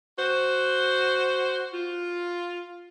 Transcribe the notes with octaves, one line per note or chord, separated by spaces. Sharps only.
F#4 C5
F4